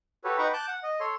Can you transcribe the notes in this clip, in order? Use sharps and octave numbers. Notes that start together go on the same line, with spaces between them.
F#4 G4 A4 B4 C#5
D#4 B4 F#5 G5 A#5 C#6
A5 D6 F#6 G6
F#5
D#5
A4 C#5 C6